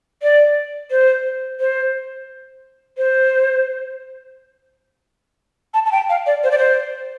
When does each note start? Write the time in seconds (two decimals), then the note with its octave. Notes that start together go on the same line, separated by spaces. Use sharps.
0.22 D5
0.91 C5
1.60 C5
2.97 C5
5.74 A5
5.86 A5
5.92 G5
6.09 F5
6.26 D5
6.44 C5
6.51 D5
6.58 C5